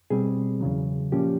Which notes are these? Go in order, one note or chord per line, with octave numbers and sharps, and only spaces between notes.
B2 G3 C4 G#4
E2 C#3 F#3
A#2 F3 A#3 C#4 G4